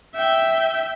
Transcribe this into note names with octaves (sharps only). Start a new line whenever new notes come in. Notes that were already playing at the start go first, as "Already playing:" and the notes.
E5 G5